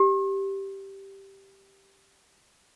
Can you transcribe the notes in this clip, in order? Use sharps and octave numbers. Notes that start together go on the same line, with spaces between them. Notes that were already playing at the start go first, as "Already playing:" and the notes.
Already playing: G4